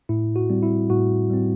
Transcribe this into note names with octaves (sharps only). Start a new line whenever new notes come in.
A2 E4
F#4
G3 C4
E4
A2 F#4
G3 C4